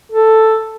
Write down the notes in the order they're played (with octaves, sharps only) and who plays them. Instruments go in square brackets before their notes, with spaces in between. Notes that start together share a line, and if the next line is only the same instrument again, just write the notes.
[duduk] A4